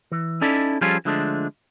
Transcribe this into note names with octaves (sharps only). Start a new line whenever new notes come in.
E3
C#4 D#4 E4 A4 D5
F3 G3 C#4 F4 G#4 A4
D3 F3 G#3 A3 C4 D4